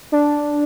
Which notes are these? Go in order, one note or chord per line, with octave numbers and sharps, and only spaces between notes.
D4